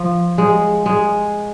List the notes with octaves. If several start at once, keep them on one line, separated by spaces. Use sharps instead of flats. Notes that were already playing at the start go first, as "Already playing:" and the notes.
Already playing: F3
G#3
G#3